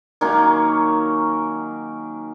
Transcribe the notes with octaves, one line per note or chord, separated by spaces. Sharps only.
D#3 F#3 A#3 C#4